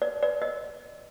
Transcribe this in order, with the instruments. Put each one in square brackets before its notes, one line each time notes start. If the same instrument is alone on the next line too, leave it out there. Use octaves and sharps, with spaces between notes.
[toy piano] D5
D5
D#5